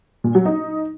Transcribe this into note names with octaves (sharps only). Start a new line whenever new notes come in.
A#2
F#3
D#4